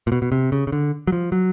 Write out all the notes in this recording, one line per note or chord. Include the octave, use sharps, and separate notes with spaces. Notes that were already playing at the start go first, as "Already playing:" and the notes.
A#2
B2
B2
C3
C#3
C#3
D3
F#3
F3
F#3